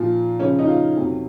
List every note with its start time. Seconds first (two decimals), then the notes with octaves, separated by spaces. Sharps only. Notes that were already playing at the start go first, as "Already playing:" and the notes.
Already playing: A#2 F3 F4
0.39 F#2 C#3 F3 C#4
0.59 D#4
0.68 F4
0.96 F2 C3 F#3